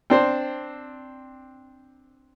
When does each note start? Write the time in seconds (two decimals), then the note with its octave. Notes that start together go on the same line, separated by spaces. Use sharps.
0.10 C4 D4 C5